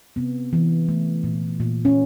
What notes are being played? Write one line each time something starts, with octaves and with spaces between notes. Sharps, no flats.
C3 B3
E3
A3
A#2
A#2
C#4